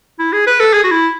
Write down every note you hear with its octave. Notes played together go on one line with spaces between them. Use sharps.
E4
G#4
B4
A4
G#4
F#4
E4